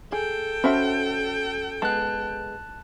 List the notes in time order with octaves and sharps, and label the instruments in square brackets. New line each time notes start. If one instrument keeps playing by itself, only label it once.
[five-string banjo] G#4 [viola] A4 G5
[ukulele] C#4 F#4 C5 [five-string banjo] E5 A5 B5
[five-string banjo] G#3 B3 [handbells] A5 F#6